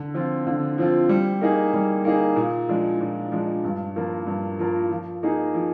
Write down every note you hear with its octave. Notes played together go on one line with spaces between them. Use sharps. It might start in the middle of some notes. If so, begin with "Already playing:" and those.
Already playing: D3
F3 C4 F4
D3
F3 C4 F4
G3
A#3 D#4 G#4
G3
A#3 D#4 G#4
A#2
F3 G#3 D4
A#2
F3 G#3 D4
G2
F3 A#3 F4 A#4
G2
F3 A#3 F4 A#4
F3
A#3 D#4 G#4
F3